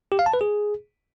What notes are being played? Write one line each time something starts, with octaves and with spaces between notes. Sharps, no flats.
G4
F5
A5
B4
G#4